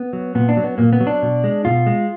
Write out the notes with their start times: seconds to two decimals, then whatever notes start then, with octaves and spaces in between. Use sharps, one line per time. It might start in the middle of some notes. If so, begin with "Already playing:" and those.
Already playing: B3
0.13 F#3
0.35 A#2 B3
0.49 D4
0.57 F#3
0.64 B3
0.78 A#2 A#3
0.93 B3
1.00 F#3
1.07 D4
1.22 B2
1.44 G#3
1.65 B2 F4
1.87 G#3